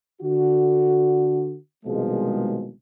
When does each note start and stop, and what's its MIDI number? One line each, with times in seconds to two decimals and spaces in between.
0.22 1.56 50
0.22 1.56 66
1.86 2.72 36
1.86 2.72 47
1.86 2.72 51
1.86 2.72 53
1.86 2.72 56